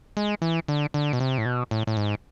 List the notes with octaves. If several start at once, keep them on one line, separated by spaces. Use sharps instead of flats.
G#3
E3
D3
D3
B2
C3
A2
B2
A2
A2
G#2